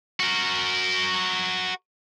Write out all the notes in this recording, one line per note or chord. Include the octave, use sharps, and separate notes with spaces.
F#4 A#4